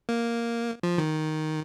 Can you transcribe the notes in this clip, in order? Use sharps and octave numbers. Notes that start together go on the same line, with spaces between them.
A#3
F3
D#3